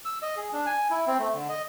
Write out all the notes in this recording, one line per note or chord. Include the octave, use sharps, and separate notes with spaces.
E6
D#5
G#4
D4
G#5
E4
C4
A3
D3
D#5